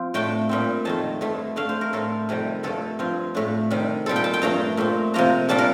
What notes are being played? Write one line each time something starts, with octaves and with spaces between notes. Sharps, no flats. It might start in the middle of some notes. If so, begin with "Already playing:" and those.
Already playing: F3 C4
A2 A3 D4 G5
A#2 G3 C4
F2 D#3 A3 A5
G2 D3 A3
D3 A3 D4 F5
C5
A#4
A2 A3 C4 A4
F2 C3 D#3 G3
G2 D3 F3 A3 A4
G2 F3 C4
A2 A3 D4
C3 D#3 G3 D4
A#2 G3 C4 A4
G5
A5
G5
G2 F3 A3 D4 A#5
A#2 A3 C4
C3 F3 A#3 D4 A#5
A#2 G3 D4 A5
A#4